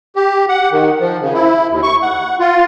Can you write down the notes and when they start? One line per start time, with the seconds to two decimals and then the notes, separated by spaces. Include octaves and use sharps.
0.16 G4
0.49 F#5
0.72 D#3
1.00 F3
1.21 C#3
1.34 E4
1.70 D#2
1.83 C#6
2.02 F#5
2.40 F4